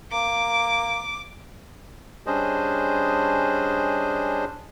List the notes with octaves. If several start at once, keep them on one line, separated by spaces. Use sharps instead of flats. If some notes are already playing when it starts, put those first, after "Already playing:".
A#3 D6
G3 C#4 D4 G#4 C5 D#5